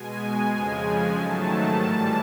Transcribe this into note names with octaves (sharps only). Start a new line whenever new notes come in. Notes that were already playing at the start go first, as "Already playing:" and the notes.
Already playing: B2 G#3 G#5
F2 C#3 F3 G#3
G#2 D#3 F#3 A3 A5
A2 E3 G3 A5